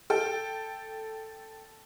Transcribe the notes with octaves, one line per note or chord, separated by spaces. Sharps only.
A4 G5